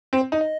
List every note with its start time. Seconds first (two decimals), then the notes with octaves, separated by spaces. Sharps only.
0.13 C4 C5
0.32 D#4
0.41 D#5